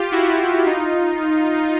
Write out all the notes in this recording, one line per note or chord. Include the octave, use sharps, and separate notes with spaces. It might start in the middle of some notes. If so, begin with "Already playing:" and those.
Already playing: F4 G4
E4 F#4
D#4 F4